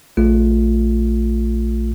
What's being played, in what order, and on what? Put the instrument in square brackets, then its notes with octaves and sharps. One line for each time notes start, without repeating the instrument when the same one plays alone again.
[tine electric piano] A#1 A3 F4